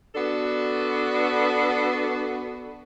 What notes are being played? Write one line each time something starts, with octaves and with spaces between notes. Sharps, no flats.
B3 D4 F#4 A4